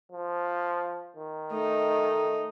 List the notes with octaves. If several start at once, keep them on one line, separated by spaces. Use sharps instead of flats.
F3
D#3
A3 D#4